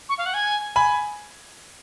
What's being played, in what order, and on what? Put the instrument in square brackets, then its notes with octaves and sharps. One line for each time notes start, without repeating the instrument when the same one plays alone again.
[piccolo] C#6
F5
F#5
G#5
[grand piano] G#5 B5